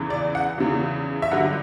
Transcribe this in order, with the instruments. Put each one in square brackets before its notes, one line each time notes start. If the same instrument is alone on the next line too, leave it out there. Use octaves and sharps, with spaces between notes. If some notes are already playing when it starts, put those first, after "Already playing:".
Already playing: [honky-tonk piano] E2 C#3 E3
D5
F#5
E2 C#3 E3
E5
G2 D3 F#3 F#5